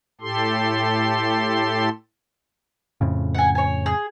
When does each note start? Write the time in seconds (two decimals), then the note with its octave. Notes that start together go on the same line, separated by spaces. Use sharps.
0.21 A2 G4 A4 C6
3.01 F2 A2 C#3
3.35 F#5 G#5
3.55 C#5 G#5
3.86 G#4